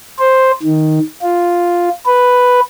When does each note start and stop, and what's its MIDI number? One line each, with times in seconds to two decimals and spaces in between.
0.19 0.51 72
0.63 0.99 51
1.22 1.89 65
2.06 2.60 71